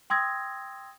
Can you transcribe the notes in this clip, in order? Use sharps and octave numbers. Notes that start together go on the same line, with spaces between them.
G5 C6 D#6 E6 G#6 A#6